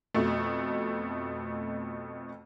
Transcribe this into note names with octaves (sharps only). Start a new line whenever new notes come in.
F2 B2 A3